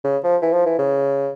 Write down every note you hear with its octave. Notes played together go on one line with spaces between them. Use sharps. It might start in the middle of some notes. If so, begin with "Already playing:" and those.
C#3
F3
E3
F3
E3
C#3